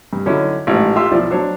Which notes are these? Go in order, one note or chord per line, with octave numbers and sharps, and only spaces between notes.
G2
D3 F#3 C#4 D#4 E4
A1 G#2 F3
F4 G4 E5 C6 E6
B1 F3 E4 D5 E6
F#3 D4 C5 C#5